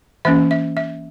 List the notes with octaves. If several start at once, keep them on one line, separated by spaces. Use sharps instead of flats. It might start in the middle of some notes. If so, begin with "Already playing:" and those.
E3 A#3 C#4 E5
E5
E5